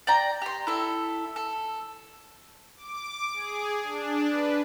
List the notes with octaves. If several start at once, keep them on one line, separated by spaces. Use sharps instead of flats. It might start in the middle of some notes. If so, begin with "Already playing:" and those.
D5 G5 A#5
G4 C6
E4 A4 E5
A4
D6
G#4
D4
B4